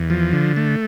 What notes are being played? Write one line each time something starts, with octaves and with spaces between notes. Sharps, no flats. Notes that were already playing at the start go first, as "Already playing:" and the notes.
Already playing: E2
F3
D3
A3